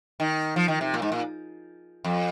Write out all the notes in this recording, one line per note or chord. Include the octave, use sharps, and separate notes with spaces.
D#3
F3
D#3
C3
A#2
G#2
A#2
F2